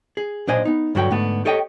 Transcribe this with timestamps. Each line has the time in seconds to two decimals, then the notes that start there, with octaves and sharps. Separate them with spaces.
0.17 G#4
0.47 B1 A#2 D4 C5 D#5 G#5
0.65 B3 D#4
0.95 G2 D3 F#3 F#4 D#5 G5
1.11 G#2 D3 A3 B3
1.45 G4 A4 C#5 D#5 F#5 G5